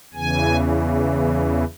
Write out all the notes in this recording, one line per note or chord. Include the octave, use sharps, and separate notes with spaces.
E2 C#3 E3 G#5